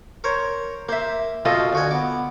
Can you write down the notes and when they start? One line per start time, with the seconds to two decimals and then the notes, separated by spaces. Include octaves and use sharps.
0.24 A#4 C5 C#5
0.89 A#3 C5 E5
1.45 F2 B2 F4 A4 D#5
1.73 D2 F#4 G#4
1.91 B3 D6